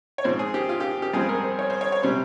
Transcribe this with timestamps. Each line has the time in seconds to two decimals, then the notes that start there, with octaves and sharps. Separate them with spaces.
0.18 C#5
0.24 G#2 F3 C4 C5
0.39 G#4
0.54 G4
0.69 F4
0.80 G4
1.02 G4
1.13 G2 F3 G#3 C4 G#4
1.29 A#4
1.44 C5
1.59 C#5
1.70 C5
1.81 C#5
1.92 C#5
2.03 C3 G3 C4 C5